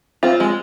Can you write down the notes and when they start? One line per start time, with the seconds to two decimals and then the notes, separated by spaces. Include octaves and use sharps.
0.23 C4 F4
0.40 G#3